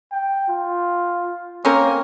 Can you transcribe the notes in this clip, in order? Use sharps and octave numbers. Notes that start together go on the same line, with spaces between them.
G5
F4
A#3 C4 C#4 A#4